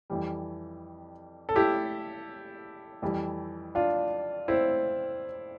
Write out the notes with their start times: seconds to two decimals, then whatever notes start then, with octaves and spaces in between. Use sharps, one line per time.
0.10 F2 E3 G3
1.49 A4
1.56 E4 G4
3.02 F2 E3 G3
3.75 D4 F4
4.48 C4 E4